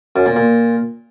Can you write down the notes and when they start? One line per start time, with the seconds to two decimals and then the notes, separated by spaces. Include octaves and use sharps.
0.16 F#2
0.26 A#2
0.36 A#2